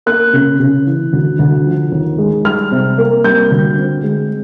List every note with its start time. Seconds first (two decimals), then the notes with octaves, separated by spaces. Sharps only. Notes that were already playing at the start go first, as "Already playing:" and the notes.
0.06 A#3 F#6
0.33 C#3
0.60 C#3
0.87 E3
1.13 D2
1.39 D2
1.66 F3
1.92 D#2
2.18 G#3
2.45 G3 F6
2.72 C3
2.98 A#3
3.24 G3 G6
3.51 D2
3.78 C4
4.03 G#3